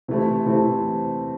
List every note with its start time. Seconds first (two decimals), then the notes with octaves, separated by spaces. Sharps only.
0.08 C3 E3 A3 C4 E4
0.46 C3 E3 A3 C4 E4